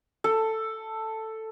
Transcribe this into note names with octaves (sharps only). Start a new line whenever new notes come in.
A4